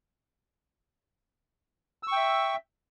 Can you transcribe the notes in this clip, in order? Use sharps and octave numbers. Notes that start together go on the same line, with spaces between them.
E5 G5 C#6 E6